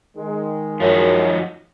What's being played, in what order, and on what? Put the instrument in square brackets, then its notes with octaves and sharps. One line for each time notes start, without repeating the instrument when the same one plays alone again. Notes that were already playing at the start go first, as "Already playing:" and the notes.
[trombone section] D#3 G#3
[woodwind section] F#2 [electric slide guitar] F3 D#4 F#4